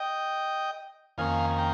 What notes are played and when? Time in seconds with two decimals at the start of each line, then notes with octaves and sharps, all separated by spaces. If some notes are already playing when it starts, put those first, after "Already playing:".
Already playing: D#5 G5
1.18 F2 D#3 A#3 C#4 F5 G#5
1.58 G5 A#5